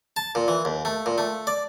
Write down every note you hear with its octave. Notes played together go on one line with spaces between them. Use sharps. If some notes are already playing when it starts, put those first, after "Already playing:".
A5
A#2
E3
D#2
A3
A#2
A3
D5